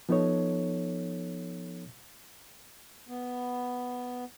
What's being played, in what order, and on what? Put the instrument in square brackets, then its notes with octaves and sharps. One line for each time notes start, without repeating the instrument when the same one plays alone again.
[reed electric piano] F3 B3 D#4 A4 C#5
[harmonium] B3